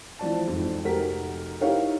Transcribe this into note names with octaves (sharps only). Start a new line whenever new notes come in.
E3 F3 D5 A5
F2 G#2
F1 F#4 G4 A#4 B6
D#4 E4 G4 A#4 C#5 F5